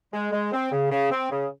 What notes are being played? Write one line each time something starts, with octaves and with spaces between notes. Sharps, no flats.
G#3
G#3
C4
C#3
C#3
C4
C#3